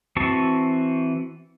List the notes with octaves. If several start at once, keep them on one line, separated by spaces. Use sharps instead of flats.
E3 C4 F#4 A5 C#6